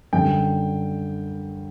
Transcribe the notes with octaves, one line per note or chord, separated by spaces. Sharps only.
F#2 D3 G3 G5